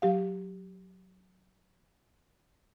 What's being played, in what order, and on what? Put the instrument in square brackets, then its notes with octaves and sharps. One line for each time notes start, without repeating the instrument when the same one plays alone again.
[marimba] F#3 G4 F5